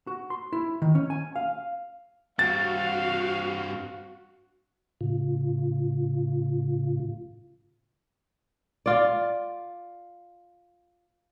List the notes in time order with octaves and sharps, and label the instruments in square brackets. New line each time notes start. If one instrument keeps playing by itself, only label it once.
[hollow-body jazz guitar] F#4
C6
E4
D#3
C#4
G#5
F5
[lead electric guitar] G2 C4 [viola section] F#4 [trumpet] F5 [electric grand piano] A6
[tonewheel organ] A2 C#3 F4
[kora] F4 D5